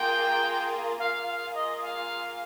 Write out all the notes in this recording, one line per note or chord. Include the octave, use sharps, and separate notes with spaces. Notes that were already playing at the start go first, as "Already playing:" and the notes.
Already playing: A#3 F4 G#4 G5
A#3 F4 G#4 F5
F5
D#5
F5